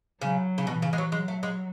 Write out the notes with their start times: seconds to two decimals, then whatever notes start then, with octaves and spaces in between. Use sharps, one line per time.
0.21 C#3 F#3
0.58 C#3
0.67 B2 E3
0.82 C#3
0.93 G#3
0.98 F#3
1.12 F#3 G#3
1.28 A3
1.43 G#3